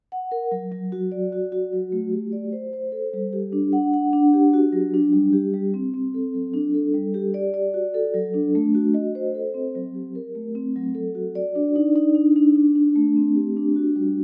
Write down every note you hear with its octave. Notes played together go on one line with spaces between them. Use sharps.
F#5
A#4
F#3
F#3
F#4
D5
F#4
F#4
F#3
A3
G4
D5
C5
C5
A4
G3
G4
D4
F#5
F#5
D4
G4
F#4
F#3
D4
G3
G4
G3
C4
C4
A4
F#3
D4
A4
G3
G4
D5
D5
F#4
A4
F#3
D4
A3
F#4
D#5
C5
A4
C4
F#3
G4
A#4
A3
C4
F#3
A4
F#4
D5
D4
D#4
D#4
D4
D4
D4
D4
A3
C4
G4
D4
F#4
G3